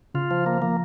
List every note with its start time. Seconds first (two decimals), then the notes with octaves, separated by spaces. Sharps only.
0.14 C#3 F4
0.31 F3
0.46 A#3
0.62 F3 A#3